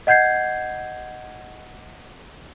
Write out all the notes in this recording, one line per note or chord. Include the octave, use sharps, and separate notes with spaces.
D#5 F#5 G6 G#6 C7